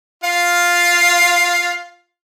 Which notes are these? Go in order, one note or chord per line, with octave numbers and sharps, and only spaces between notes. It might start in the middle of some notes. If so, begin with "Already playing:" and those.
F4 F5